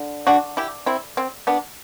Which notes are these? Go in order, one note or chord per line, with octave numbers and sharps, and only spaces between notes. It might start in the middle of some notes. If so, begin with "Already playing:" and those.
Already playing: D3
D4 F#4
E4 G4
C4 E4
C4
B3 D4